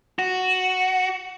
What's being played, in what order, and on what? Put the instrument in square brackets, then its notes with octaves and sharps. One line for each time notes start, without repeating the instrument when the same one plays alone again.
[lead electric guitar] F#4